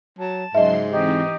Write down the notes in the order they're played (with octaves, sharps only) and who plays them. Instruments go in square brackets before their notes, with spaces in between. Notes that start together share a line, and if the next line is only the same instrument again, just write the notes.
[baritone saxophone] F#3 [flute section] A5
[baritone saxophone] G#2 [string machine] C#3 F#3 C6 [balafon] D#5 E5
[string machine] E3 C4 [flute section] D#4 G4